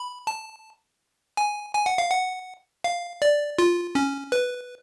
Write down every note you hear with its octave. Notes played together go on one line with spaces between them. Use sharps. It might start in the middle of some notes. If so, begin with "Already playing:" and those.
Already playing: B5
A5
G#5
G#5
F#5
F5
F#5
F5
D5
F4
C#4
B4